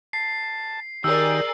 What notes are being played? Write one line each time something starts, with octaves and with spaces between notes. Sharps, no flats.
A5 C7
D#3 G4 G#4 A#4 D5 E6